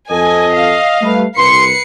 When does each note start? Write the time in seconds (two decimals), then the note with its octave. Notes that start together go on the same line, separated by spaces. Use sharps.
0.11 F2 A4 D#5 G#5
0.54 F5
1.02 G3 A3 B4
1.38 C2 B4 C6 C7 C#7